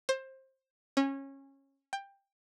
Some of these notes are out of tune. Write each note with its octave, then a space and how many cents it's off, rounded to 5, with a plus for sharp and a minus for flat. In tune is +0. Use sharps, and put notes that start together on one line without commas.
C5 +20
C#4 -20
G5 +15